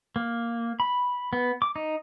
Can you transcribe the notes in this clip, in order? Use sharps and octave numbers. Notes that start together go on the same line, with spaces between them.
A#3
B5
B3
D6
D#4